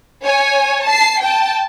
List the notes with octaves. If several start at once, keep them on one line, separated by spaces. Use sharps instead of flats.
C#5 G#5
A5 C7
G5 A5